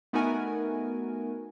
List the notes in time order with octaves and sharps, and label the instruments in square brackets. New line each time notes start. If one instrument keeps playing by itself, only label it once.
[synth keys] A3 B3 D#4 F#4 A#4 G#5